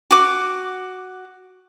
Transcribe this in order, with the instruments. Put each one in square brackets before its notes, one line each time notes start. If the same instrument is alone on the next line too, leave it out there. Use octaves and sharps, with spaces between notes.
[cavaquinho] F#4 D6